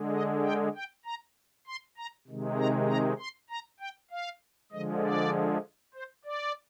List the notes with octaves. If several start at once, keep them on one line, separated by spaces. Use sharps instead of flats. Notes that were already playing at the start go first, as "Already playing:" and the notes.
Already playing: D3 G#3
D#5
G5
G5
A#5
C6
A#5
C3 D#3 G#3
A#5
A#5
C6
A#5
G5
F5
D3 F3 G#3 D#5
D5
C5
D5